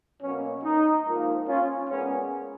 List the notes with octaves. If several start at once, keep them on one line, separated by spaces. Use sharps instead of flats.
B2 F#3 A#3 C#4
D#4
G#2 F3 A#3
C#4 F4
A#2 G#3 B3 C#4